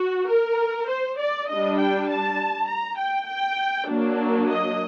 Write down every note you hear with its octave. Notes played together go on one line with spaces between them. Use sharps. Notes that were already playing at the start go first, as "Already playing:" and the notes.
Already playing: F#4
A#4
C5
D5
G3 D4 D#5
G5
A5
A#5
G5
G5
F#3 A#3 D4
D#5